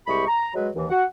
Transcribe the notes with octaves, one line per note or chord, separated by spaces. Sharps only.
C2 G#3 E4 G4 B5 C#6
A#5
F#3 G#3 B4
D#2 E3
F#4 F#5